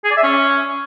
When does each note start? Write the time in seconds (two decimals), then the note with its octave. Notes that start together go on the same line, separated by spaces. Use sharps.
0.04 G#4
0.11 D5
0.17 E5
0.23 C#4